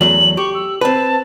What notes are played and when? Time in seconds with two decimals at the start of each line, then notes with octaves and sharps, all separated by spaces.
0.01 E2 F#3 A3 F#7
0.37 G4 C#6
0.55 E6
0.81 C4 B4 A5